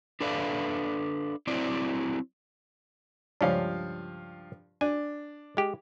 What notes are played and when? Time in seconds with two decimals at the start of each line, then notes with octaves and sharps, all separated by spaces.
0.21 D4 A4 B4 D5 E5 F5
1.47 F#3 C4 E4 D5
3.41 C#2 G2 F3 C#4 D4 F5
4.81 D4 G#5
5.57 G#3 G4